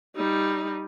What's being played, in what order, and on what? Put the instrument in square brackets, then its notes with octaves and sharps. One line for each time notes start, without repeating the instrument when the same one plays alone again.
[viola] G3 D#4